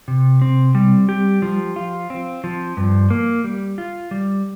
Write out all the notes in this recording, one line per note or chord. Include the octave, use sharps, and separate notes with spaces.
C3
C4
G3
G4
F3
F4
C4
F3
G2
A#3
G3
F4
G3